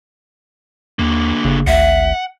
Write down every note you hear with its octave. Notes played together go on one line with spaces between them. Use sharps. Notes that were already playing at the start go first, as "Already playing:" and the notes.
D#2 D3 A#3
F#1 C#3
G#1 D2 E5 F#5